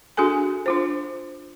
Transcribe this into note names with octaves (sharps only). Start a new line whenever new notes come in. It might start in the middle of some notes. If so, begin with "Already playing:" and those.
D4 F#4 G#4 A4 G#5
D4 F4 C5